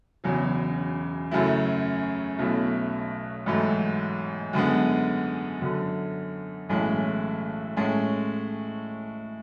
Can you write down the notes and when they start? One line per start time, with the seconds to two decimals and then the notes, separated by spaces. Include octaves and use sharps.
0.24 E1 E2 C#3 F#3
1.31 F#2 C#3 F#3 A3 E4
2.39 B1 B2 A3 C#4 E4
3.46 A1 G#2 F#3 A3
4.53 F#2 D3 G#3 B3
5.61 F#2 D3 F#3
6.69 B1 A2 E3 G#3 C#4
7.77 A2 G#3 C#4